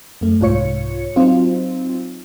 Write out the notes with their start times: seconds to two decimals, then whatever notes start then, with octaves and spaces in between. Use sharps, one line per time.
0.21 F#2 A3
0.40 C2 G#2 F4 C#5 C#7
1.16 F#3 C4 D#4 F4